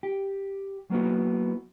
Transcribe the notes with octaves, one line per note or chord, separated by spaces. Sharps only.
G4
F#3 A#3 B3 E4 F#4